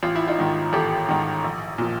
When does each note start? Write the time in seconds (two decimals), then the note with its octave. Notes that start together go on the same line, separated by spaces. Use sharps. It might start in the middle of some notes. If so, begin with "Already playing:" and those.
0.03 A1 F4
0.16 E4
0.28 D#4 F4
0.39 G#2 D#3
0.73 A1 G4 A4
1.09 G#2 D#3
1.44 A#1
1.78 A#2 F3